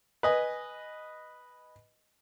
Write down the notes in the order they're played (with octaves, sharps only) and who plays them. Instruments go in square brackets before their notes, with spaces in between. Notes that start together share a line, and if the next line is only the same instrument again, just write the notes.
[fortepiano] B4 D#5 G#5